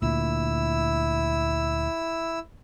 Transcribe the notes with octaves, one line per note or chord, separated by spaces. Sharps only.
D2 A#2 E4 E6